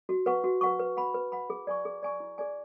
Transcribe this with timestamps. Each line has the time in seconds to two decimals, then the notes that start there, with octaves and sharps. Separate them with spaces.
0.09 F#4
0.26 B4 F#5 C#6
0.44 F#4
0.61 B4 F#5 C#6
0.80 B4
0.97 F#5 B5
1.14 B4
1.32 F#5 B5
1.50 G#4
1.67 D5 G#5 C#6
1.85 G#4
2.03 D5 G#5 C#6
2.20 E4
2.38 G#4 D5 G#5